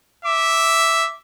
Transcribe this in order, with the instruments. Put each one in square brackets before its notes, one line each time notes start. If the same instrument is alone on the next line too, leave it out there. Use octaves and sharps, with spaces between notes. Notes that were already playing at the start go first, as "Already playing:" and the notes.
[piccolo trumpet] E5 [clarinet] D6